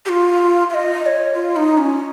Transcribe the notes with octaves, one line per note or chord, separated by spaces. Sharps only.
G4
F4
F5
D#5
D#5
C#5
F4
D#4
C#4